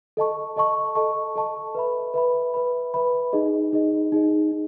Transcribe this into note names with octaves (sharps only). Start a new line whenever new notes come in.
A4 D#5 A5 C#6
A4 D#5 A5 C#6
A4 D#5 A5 C#6
A4 D#5 A5 C#6
B4 E5 B5
B4 E5 B5
B4 E5 B5
B4 E5 B5
D#4 G#4 D#5
D#4 G#4 D#5
D#4 G#4 D#5
D#4